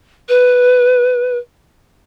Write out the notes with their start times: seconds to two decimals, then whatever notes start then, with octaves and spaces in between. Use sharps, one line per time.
0.29 B4